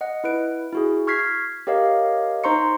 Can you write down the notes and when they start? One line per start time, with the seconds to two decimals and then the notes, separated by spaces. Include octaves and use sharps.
0.01 D#5 F#5
0.24 E4 B4 D7
0.72 E4 F#4 G#4
1.07 C#6 F6 G#6 B6 C7
1.67 G4 A#4 C#5 D#5 F5
2.44 D#4 C5 A#5 C6 C#6 C#7